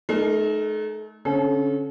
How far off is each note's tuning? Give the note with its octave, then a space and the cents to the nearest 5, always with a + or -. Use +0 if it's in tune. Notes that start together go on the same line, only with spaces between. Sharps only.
A3 -40 D#4 -5 A#4 -5
D3 -40 C#4 -25 A4 -35